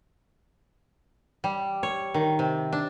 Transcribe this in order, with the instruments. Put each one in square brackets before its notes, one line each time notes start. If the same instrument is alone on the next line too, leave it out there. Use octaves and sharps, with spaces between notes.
[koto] G3
C#5
D#3
C3
D4